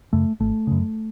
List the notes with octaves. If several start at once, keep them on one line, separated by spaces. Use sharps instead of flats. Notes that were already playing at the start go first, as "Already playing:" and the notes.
F#2 C#3 A3
G#1 A3
F#2 C#3